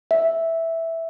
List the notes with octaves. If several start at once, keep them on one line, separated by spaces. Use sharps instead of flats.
E5